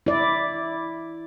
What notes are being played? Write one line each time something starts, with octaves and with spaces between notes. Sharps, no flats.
E4 D5